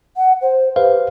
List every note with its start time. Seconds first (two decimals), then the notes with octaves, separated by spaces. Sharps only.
0.16 F#5
0.41 C5
0.76 G4 B4 C5 F5